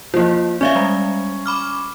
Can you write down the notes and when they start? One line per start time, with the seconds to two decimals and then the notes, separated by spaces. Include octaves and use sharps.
0.14 F3 A#3 E4
0.61 C#4 D5 E5 F5
0.75 G3 G#3
1.46 B5 D6 F6